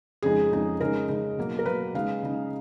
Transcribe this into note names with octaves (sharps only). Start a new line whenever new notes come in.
F2 C#3 G#3 D#4 G#4
F2 C#3 G#3 D#4
C#3 G#3 D#4 A#4
C#3 G#3 D#4
B2 F#3 A#3
A#4
B2 F#3 A#3 B4
C#3 G#3 D#4 F5
C#3 G#3 D#4